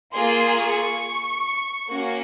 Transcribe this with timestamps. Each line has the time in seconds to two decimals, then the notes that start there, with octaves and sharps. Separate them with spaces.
0.16 A#3 F4 G#4 C6
0.59 C#6
1.90 A#3 C#4 F#4